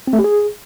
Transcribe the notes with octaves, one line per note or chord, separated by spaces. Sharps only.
C4
A3
G4
G#4